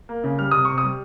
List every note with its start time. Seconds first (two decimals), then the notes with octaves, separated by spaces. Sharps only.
0.09 A#3
0.24 C#3
0.38 G3 F6
0.51 C3 D#6
0.65 C3 C#6
0.78 D#6
0.83 G3